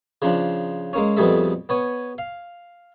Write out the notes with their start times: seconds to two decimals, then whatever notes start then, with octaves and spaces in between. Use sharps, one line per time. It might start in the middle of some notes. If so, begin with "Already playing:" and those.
0.22 C#3 F3 D4
0.93 G#3 A#3 C#4
1.17 F2 B2 G3 G#4 A4 E5
1.69 B3 C#5 G#5
2.18 F5